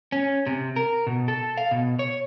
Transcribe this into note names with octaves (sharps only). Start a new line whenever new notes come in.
C#4
C3
A#4
B2
A4
F5
B2
C#5